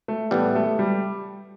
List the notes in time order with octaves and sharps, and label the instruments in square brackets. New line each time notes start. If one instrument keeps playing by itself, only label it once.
[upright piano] A3
[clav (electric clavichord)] A2 E3 G3 [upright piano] B3
[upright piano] A3
G3